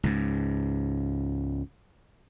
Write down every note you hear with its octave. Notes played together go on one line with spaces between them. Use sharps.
C#2 G#2